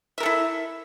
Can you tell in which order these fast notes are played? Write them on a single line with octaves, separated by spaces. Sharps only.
E5 A#4 A4 E4